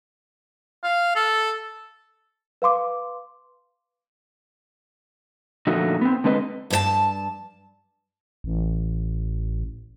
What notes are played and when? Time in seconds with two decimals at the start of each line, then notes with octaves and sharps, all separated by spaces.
0.84 F5
1.16 A4
2.62 B4 F5 C6 D6
5.67 A#2 D3 F3 A3 D#4 F#4
6.01 B3 C4
6.24 D3 G#3 C4 B4 D#5
6.70 G2 B4 A5
8.44 A1